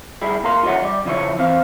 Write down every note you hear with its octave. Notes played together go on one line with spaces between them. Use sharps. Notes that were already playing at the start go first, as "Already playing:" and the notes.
G3 E4 G#4
A#2 A#4 F5 C6
F4 G4 C#5 E5 F#5
G3 D5
C#3 F3 E4 C#5
E3 C4 F5